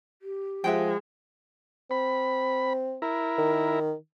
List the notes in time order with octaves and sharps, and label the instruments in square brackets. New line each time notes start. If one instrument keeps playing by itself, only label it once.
[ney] G4
[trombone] F3 [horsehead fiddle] G#3 [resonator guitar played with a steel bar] E5 F#5 G5
[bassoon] C4 [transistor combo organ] B5
[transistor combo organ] E4 A#4
[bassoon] D#3